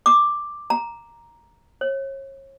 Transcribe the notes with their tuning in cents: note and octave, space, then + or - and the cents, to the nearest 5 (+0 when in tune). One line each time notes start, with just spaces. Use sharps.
D6 +5
A#5 +5
C#5 -35